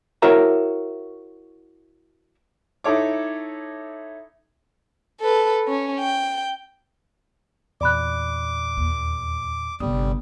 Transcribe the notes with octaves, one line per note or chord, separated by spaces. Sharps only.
E4 F#4 A#4 C#5 E5 A#5
D#4 E4 A4 C#5 D6
A4 B4
C#4
G5
E2 A#2 D5 B5 D6 F#6
D#2
G1 C3 G3 D#6